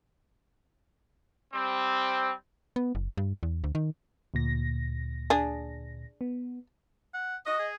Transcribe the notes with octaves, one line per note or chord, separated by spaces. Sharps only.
G3 C4
B3
F#1
G2
E2
D2
D#3
D2 A#2 A#6
D4 G#4
B3
F#5
F#4 D#5
G#4